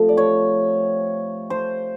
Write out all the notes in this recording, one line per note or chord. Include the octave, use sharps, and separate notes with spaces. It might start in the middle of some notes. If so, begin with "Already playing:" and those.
Already playing: C3 F3 A3
D5
C#5
C5